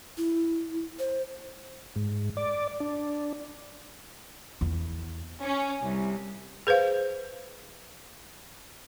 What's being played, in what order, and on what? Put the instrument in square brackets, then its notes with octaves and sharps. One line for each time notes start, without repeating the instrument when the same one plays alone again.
[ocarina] E4
C5
[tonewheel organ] G#2
D5
D4
[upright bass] E2
[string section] C#4
C2
[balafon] G#4 B4 C5 F5